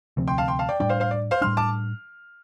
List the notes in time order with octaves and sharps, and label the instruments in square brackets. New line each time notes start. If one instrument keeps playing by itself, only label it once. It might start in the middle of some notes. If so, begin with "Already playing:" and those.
[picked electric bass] D2 C3 F3 C4
[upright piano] G5 C6
F5 A5
G5 C6
F5 A5
D5 G5
[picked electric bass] A2 G3 D4 [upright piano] D5 G5
[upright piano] C5 F5
C5 F5
D5
C5 F5
[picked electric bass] A2 G3 D4 [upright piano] C6 F6
[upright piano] A5 D6